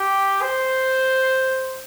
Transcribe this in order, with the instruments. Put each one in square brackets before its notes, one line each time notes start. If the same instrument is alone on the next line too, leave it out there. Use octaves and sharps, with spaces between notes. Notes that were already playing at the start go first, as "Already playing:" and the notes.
Already playing: [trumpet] G4
C5